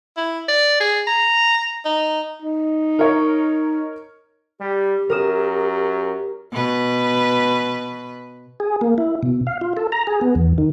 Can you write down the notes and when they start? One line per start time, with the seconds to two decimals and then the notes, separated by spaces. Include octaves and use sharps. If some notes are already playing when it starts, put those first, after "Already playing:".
0.17 E4
0.48 D5
0.80 G#4
1.07 A#5
1.85 D#4
2.42 D#4
2.99 A#4 C#5
4.60 G3 G4
5.10 F#2 A#4 D#6 E7
6.52 B2 B4
8.60 G#4
8.81 A#3
8.98 E4
9.23 B2
9.47 F5
9.61 F4
9.77 A4
9.92 A#5
10.07 G#4
10.21 B3
10.35 E2
10.58 D#3